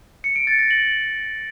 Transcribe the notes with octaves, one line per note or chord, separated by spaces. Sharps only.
C#7
D7
A6
A#6
F#7